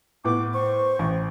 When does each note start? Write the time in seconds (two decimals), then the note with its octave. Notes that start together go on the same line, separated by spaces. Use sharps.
0.25 A2 B3 D6
0.54 C5 C#6
0.99 A1